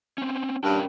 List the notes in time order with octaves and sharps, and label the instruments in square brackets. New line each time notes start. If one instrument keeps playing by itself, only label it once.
[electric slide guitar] C4 C#4
[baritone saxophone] G2 [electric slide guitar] C#4 A#4 G5